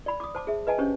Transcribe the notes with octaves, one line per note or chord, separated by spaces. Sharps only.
D5 B5
D6 D#6
C5 A5 D6
G#4 E5
B4 D#5 G#5 A5
C#4 D4 G4 C5 C#5